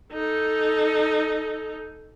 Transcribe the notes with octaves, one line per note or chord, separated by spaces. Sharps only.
D#4 A4